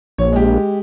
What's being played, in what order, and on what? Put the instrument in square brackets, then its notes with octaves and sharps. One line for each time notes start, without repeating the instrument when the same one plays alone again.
[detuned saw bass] A#1 [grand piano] C#5
[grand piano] G#3 G4